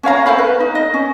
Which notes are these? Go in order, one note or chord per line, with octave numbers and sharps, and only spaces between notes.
C#4 C#5 F5 A#5
A4 C5 F5 B5
B4
D#4
D#5
C#4